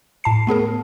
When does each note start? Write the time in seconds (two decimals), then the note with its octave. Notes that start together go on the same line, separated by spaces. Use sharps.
0.24 A2 A5 C7
0.47 A3 B3 G#4 A#4